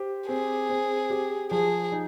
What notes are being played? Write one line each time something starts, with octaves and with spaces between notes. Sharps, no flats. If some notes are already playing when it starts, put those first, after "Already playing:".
Already playing: G4 C5
C4 G#4
C4
G4
F3 G#4
D#4